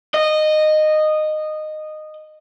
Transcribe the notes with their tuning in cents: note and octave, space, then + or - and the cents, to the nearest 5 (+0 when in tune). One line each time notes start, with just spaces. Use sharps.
D#5 -15